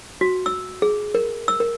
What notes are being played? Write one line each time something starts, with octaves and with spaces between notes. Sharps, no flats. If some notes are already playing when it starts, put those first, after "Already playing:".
F#4
E6
G#4
A#4
E6
A#4